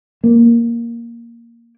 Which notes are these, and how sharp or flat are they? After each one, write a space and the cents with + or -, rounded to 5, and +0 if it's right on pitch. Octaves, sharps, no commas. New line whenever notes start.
A#3 +0